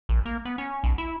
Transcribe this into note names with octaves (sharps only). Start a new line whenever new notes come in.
A#1
A#3
B3
C#4
B1
E4